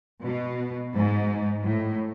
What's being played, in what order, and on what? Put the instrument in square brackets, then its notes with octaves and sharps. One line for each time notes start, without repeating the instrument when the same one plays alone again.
[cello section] B2
G#2
A2